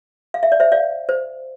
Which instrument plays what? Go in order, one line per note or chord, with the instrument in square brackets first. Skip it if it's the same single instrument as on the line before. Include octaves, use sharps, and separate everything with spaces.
[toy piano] F5
E5
D5
C5 E5
D5 F5
C5